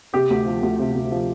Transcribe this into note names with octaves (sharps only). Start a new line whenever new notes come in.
C3 G4
D2
F3
D2
C3
D2
F3